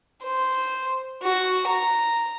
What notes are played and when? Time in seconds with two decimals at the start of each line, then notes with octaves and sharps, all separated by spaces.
0.23 C5
1.22 F#4
1.68 A#5